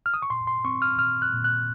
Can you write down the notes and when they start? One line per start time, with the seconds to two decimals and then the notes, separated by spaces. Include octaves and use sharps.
0.06 F6
0.14 D#6
0.22 C#6
0.30 A#2 C6
0.47 C6
0.65 C4 C#6
0.82 F6
0.99 A#2 F6
1.22 F#6
1.33 A#2
1.44 F#6